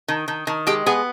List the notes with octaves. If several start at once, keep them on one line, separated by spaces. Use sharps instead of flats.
D#3
D#3
D#3
G#3 G4
B3 G#4